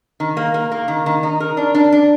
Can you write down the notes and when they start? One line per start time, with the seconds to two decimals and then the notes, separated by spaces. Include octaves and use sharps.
0.20 D#3
0.37 A#3
0.54 A#3
0.71 A#3
0.88 D#3
1.06 D#3
1.23 D#4
1.40 A#4
1.57 D4
1.75 D4
1.92 D4